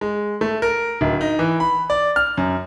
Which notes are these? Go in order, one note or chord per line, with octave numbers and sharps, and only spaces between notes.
G#3
A3
A#4
D1
D#4
E3
B5
D5
F6
F#2